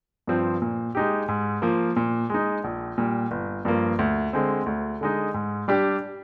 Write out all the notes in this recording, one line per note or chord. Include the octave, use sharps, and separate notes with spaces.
G2 F3 C4
A#2
G#3 D#4 G4
G#2
F3 A#3
A#2
G#3 D#4
A#1
A#2 G3
G1
G2 F3 A#3
D2
D3 G#3 C4
D2
D3 G#3 D#4
G#2
G3 D4 G4